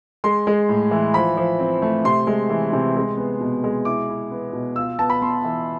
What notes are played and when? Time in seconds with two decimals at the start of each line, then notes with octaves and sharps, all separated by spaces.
0.24 G#3 C6
0.47 G#3
0.69 A2
0.91 E3
1.14 F3 B5
1.37 F3
1.59 C4
1.82 A3
2.05 C3 C6
2.27 G#3
2.50 E3
2.73 C3
2.96 G#3
3.17 B3
3.41 B2
3.64 G#3
3.85 E4 D6
4.09 E4
4.31 B3
4.53 B2
4.76 F4 E6
4.99 B3 A5
5.10 B5
5.22 B3 C6
5.44 E3